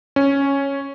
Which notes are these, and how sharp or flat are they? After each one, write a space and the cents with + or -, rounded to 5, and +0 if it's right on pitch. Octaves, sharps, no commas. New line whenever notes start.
C#4 +0